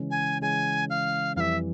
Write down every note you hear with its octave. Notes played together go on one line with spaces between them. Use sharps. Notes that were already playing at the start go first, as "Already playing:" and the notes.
Already playing: C#3 E3 G#3 C#4
G#5
C#3 E3 G#3 C#4 G#5
F5
F2 E3 G3 E5 F5